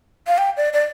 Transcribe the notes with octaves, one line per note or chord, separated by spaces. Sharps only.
F5
G5
D5
D5